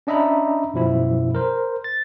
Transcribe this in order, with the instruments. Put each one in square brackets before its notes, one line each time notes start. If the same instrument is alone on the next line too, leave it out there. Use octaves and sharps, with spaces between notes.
[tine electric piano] C#4 D4 D#5 E5 A#5 B5
F#2 B2 F3 E4
A#4 C5
A6